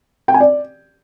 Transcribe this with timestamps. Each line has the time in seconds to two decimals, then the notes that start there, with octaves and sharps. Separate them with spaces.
0.28 G5
0.34 G#5
0.40 D5